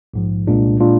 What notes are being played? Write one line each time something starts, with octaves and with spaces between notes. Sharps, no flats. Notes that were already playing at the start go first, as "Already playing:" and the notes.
A#1 G#2 F3
C2 A#2 G#3 D4 F4
A#2 G#3 D4 F4